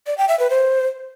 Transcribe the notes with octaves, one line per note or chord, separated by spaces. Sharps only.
D5
G5
E5
B4
C5